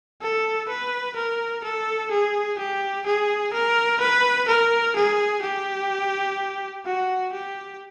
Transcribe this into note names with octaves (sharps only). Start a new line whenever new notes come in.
A4
B4
A#4
A4
G#4
G4
G#4
A#4
B4
A#4
G#4
G4
F#4
G4